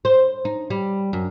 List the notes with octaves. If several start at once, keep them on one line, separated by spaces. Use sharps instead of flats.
C5
D#4
G3
F#2